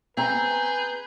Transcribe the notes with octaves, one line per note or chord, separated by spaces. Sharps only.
C4 G#4 B4 A#5 G6